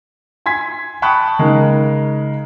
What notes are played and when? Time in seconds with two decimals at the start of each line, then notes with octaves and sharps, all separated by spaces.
0.46 G#5 C6 G#6 B6
1.02 G5 A5 B5 C#6 D#6 F#6
1.39 C#3 G#3 D#4 A#4